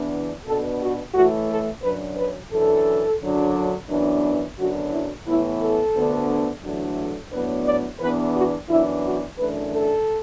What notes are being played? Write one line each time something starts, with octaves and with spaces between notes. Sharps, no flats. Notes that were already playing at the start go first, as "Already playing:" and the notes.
Already playing: E2 E3 B3 D4
B2 B3 D4 A4
F#4
A2 E3 A3 F#4
A4
F#2 F#3 D4 B4
B4
F#2 E3 D4 A4
F#2 D3 F#3 D4
F#2 E3 B3 D4
F#2 D3 F#3 B3 D4 F#4
E4
A2 E3 B3 E4
A4
D2 D3 B3 D4
E2 D3 F#3 A3 D4
A2 F#3 B3 D4 B4
D5
E2 E3 B3 D4 B4
F#4
F#2 E3 B3 D4 E4
F#4
F#2 E3 A3 D4 B4
A4